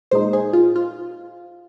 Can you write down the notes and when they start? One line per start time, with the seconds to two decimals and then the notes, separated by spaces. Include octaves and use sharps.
0.11 A#2 G#3 D#4 C5
0.33 G#4
0.53 F4
0.76 F4